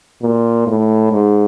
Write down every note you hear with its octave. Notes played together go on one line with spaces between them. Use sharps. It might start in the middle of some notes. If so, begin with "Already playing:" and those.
A#2
A2
G#2